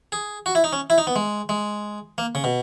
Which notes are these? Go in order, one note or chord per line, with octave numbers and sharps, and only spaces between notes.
G#4
F#4
E4
D#4
C#4
E4
D#4
B3
G#3
G#3
A#3
C#3
B2